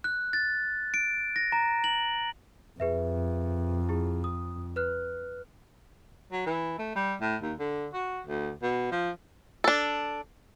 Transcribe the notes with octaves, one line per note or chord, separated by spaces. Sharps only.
F#6
A6
D7
A#6
A#5
F#7
F2 G#4 B4 E5
E4 G#4
D#6
B4 F6 F#6
F#3
E3
A3
G3
A2
D#2
D3
F#4
D2
B2
F3
D4 A4